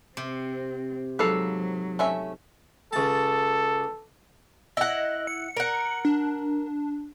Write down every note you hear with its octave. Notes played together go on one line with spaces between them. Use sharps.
C3 C4
G#2 F#3 A4 B4 F5
A3 C#4 E5
C#2 A4 A5
E4 D#5 F#5
C#7
A#4 F#5
D4